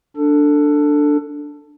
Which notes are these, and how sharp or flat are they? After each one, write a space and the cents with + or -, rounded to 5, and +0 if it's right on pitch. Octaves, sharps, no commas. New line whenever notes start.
D4 +0 A4 +20